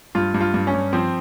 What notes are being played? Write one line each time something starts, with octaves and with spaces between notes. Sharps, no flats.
G2 F4
G2
F4
G2
C#4
G2
F3 C4